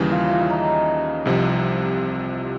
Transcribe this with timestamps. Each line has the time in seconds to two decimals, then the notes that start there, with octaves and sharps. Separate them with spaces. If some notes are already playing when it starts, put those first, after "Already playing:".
Already playing: D#2 C#3 E3 G3
0.11 F4
0.30 E4
0.41 E4
0.50 D#4
1.25 C2 C3 F3